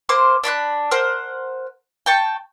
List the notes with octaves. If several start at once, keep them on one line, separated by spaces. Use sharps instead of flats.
A#3 C5 C6 D6
D4 B5 C6 F#6
A#4 C5 F#5
G5 A5 C#6